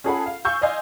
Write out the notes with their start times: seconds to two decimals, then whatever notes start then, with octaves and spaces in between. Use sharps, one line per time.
0.04 C#4 F4 G#4 A4 F#5 B5
0.26 F5
0.45 F5 G#5 C#6 E6 G6
0.61 D5 D#5 F5 G#5 C6